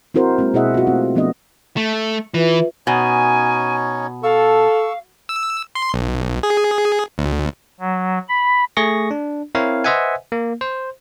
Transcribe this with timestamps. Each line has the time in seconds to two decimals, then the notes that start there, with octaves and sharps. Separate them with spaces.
0.14 C4 E4 F#4 A#4 C5
0.38 G#3 A#3 C4
0.54 B2 E4 G#4 D#5 E5 F#5
0.74 F4 F#4
0.87 A3 C4 F4
1.15 F3 A3 B3 D4 D#5
1.77 A3
2.34 E3 F4 B4 E5
2.87 B2 C#4 D#4 C#5 G#5
4.23 A4 F5 C#6 E6
5.29 E6
5.75 C6
5.94 B1
6.43 G#4
7.18 D2
7.80 F#3
8.29 B5
8.77 A3 G#4 C#6 A#6
9.11 D4
9.55 C4 E4 A#4 C5 C#5 F5
9.84 B4 C5 D#5 E5 F#5 G#5
10.32 A#3
10.61 C5